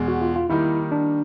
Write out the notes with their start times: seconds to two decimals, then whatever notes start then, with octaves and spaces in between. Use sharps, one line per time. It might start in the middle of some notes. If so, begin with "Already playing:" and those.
Already playing: E2 B2 G#3
0.08 F#4
0.22 F4
0.36 F4
0.50 D#3 G3 A#3 D#4 E4
0.92 D4